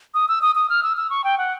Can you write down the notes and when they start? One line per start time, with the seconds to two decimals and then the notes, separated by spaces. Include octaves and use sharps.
0.14 D#6
0.28 E6
0.42 D#6
0.55 D#6
0.70 F6
0.83 E6
0.97 E6
1.10 C#6
1.24 G5
1.38 F#5